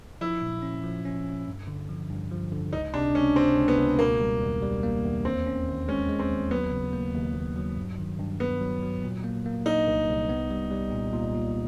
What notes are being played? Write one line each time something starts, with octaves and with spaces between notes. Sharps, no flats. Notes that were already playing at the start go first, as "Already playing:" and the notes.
F3 E4
A#2
C#4
F3
C#4
C#4
G2
D3
F3
G2
F3
D3
C#2 D#4
C3 D4
C#2 C#4
C3 C4
C#2
B3
C#2
B2 A#3
G3
E2
G3
A#3
E2
D#2 C4
C#4
D#2
G#3 C#4
G#3
C4
D#2
F#3 B3
C#3
A#3
D#2
D#2
F#3
G2
D#3
G2
G2 B3
F#3
F#3
A#2
A#3
A#3
A#3 D#4
C2
C2
B3
G3
G3
A#2
A#2
A#2